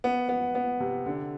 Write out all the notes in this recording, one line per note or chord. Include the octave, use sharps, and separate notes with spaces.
B3
B3
B3
C3
D3